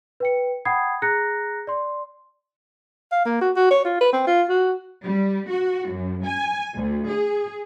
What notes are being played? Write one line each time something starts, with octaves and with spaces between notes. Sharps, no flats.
B4 G5 C#7
F#5 G5 B5 D#6 G#6 C7
G#4 A#5 F#6 A#6 C#7
D5 C6
F5
A#3
F#4
F#4
C#5
F4
B4
C4
F4
F#4
G3
F#4
F#2
G#5
D2
G#4